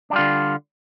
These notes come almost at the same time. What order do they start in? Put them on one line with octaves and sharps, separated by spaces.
D4 G3 F4 D3